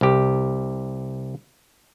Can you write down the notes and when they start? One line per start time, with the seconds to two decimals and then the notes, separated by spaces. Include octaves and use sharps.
0.01 C2 G4